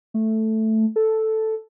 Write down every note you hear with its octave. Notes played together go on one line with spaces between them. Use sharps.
A3
A4